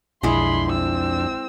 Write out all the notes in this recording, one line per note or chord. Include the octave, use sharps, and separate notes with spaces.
B1 F2 G#3 D4 E4 G#4 B5 C6
C4 E6